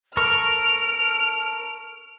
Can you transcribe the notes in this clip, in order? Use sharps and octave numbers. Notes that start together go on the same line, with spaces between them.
A4 A#4 C#6 F6 D7 F7